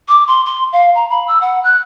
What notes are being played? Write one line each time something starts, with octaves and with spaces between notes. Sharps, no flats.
D6
C6
C6
F5
A#5
B5
E6
F#5
F#6